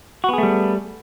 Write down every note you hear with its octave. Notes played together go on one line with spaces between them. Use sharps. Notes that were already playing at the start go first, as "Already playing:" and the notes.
G3 A3 B3 F#4 G#4